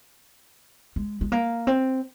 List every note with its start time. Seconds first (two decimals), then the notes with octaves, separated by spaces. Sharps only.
0.96 G#3
1.21 G#3
1.32 A#3
1.67 C4